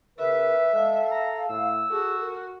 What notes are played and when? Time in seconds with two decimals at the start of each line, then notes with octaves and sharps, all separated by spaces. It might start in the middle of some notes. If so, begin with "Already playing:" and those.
0.18 C#3 A#4 B4 E5
0.73 G#3 A4 F5
1.11 A#5
1.49 A2 E6
1.91 F#4 G#4 A4
2.20 A#4